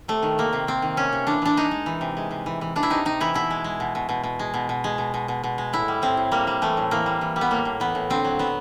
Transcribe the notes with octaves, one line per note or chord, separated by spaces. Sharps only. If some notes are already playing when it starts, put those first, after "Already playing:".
C3 A3
D#3
C3 A#3
C3
C3 C4
D#3
C3 C#4
C3
E3 D4
E3 D4
G#3 D#4
G#3
E3
C3
G#3
C3
E3
E3
E3 D4
E4
C3 D#4
C3 D#4
E3 E4
B2 E4
G#3
G#3
B2
B2
B2
B2
G#3
B2
B2
G#3
B2
B2
B2
B2
G#3
A2 E4
G3
A2 C4
A2
G3 A#3
G3
E3 A3
A2
E3 A#3
G3
E3
G3
B3
A2 A#3
A2
E3 B3
A2
D3 C4
F#3
F#3 B3